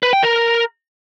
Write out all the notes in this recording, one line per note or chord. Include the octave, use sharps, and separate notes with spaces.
B4
G5
A#4